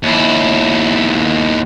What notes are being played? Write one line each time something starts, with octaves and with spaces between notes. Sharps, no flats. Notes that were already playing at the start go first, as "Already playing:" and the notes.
D#2 E4